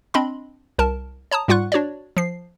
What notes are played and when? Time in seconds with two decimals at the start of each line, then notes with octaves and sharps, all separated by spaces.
0.14 C4 D4 D#5 B5 C6
0.79 C2 A#4 A5
1.31 C#5 A5 A#5 D#6
1.48 G#2 G3 F4 F#5 C#6 F#6
1.72 D4 F#4 C#5 D5
2.17 F3 C7